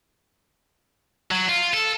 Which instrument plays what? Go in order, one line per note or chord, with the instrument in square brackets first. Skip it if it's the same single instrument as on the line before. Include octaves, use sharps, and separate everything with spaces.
[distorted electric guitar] F#3
F4
A4